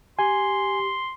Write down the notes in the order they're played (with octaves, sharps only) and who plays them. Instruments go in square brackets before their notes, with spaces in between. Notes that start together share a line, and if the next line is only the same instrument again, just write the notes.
[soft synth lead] G4 [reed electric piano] G#5 [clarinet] C6